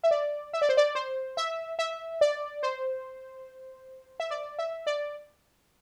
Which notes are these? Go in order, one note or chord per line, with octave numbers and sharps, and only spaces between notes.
E5
D5
E5
D5
C5
D5
C5
E5
E5
D5
C5
E5
D5
E5
D5